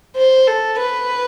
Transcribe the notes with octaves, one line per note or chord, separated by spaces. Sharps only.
C5
A4
B4